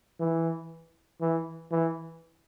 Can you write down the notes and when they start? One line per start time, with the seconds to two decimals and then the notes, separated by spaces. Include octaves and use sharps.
0.20 E3
1.21 E3
1.72 E3